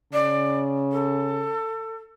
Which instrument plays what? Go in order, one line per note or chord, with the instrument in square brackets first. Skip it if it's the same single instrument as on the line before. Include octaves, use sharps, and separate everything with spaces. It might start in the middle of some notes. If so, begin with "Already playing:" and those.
[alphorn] C#3 [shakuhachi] D5
[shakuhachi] A4